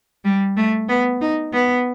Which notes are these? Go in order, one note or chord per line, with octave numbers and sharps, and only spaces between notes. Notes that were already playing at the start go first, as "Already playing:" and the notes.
G3
A3
B3
D#4
B3